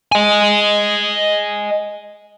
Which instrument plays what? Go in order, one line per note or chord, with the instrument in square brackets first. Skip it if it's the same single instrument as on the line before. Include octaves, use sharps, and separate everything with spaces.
[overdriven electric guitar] D#5 G#5